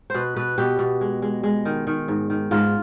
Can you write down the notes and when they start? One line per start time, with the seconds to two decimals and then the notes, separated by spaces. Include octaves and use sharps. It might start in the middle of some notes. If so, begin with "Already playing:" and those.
0.10 B2 B4 C5
0.36 B2 B4
0.58 B2 G4
0.79 B2
1.01 G#3
1.22 G#3
1.43 G#3
1.65 D#3
1.87 D#3
2.08 G#2
2.30 D#3
2.51 G#2 F4